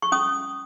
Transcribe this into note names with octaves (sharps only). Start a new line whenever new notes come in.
C#6
C#4 D#6